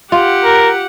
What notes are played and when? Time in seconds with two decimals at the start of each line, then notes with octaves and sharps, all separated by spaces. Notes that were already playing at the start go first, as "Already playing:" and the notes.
0.12 F4 G4 F#5
0.44 A#4